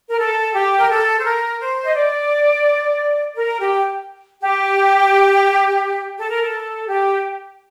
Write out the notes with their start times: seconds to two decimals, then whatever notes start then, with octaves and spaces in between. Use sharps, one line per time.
0.09 A#4
0.19 A4
0.53 G4
0.78 A#4
0.89 A4
1.20 C5
1.24 A#4
1.60 C5
1.84 D#5
1.95 D5
3.35 A#4
3.60 G4
4.42 G4
6.18 A4
6.30 A#4
6.42 A4
6.88 G4